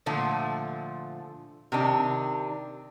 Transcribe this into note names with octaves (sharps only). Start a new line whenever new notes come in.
A#2 D3 F3 A3
C3 D#3 D4